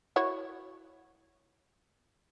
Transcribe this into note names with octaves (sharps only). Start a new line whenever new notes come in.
E4 F#4 C#5